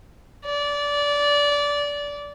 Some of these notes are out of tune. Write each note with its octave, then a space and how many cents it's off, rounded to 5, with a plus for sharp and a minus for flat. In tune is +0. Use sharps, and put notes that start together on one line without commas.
D5 -20